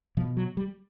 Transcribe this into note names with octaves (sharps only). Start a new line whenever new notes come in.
B2 F3
F#3
G3